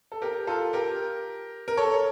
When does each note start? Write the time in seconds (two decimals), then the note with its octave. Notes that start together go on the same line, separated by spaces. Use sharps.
0.12 A4
0.22 G4 A#4
0.47 F4 A4
0.73 G4 A#4
1.68 A#4
1.77 A4 C#5